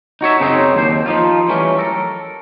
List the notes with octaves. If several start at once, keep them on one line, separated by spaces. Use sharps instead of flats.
D#4 F#4 C#5 E5
F#2 C#3 F#3 C4 D#4
D#2 D4 C5
F3 D#4 F4
E3 F#3 G3 A3 C#4
A4 A#4